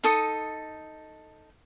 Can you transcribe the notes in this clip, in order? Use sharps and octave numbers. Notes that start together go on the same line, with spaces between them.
D#4 A4 D#6